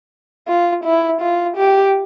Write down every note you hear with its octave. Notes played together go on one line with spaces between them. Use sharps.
F4
E4
F4
G4